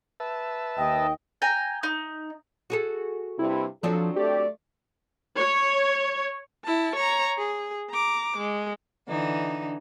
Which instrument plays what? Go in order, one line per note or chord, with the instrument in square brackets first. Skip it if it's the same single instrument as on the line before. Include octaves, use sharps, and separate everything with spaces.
[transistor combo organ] B4 E5 A5
[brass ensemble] D#2 D#5 [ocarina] G5
[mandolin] G5 G#5 A#5
D#4
[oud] F#4 G#4 A4
[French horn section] G2 C3 [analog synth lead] E4
[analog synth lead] F3 [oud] F#3 C4 D4 [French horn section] A4
[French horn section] A3 D5 [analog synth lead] G4
[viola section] C#5
[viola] E4 A5
C#5 A#5
G#4
A#5 D6
G#3
[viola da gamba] D3 E3 D#4